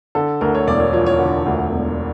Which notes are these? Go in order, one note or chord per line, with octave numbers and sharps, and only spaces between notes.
D3 A4
D2 A#4
C#5
E1 D5
C#5
F3 C#5
C#5
D3
D2
E1